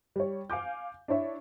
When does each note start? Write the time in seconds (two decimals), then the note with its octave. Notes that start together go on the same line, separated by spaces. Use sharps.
0.16 G3 C#5
0.50 F5 G#5 D6 G6
1.08 D4 E4 C#5 E5